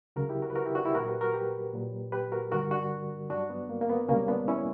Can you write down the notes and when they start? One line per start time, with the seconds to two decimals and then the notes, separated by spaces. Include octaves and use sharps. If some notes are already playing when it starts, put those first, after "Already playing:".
0.16 C#2 C#3 F#3 F#4 A#4
0.29 E4 G4
0.42 F#4 A#4
0.50 B4
0.55 F#4 A#4
0.65 E4 G4
0.75 D4 F#4
0.85 E4 G4
0.95 A#2 F#3 F#4 A#4
1.08 G4 B4
1.21 F#4 A#4
1.34 G4 B4
1.73 A#2 F#3
2.12 G4 B4
2.32 F#4 A#4
2.51 G2 D3 G3 F#4 A#4
2.71 D4 F#4
3.30 G2 F#3 D4 F#4
3.50 B3
3.69 A#3
3.81 A#3
3.89 B3
4.08 C#2 B2 G3 A#3 C#4
4.28 B3 D4
4.48 C#4 E4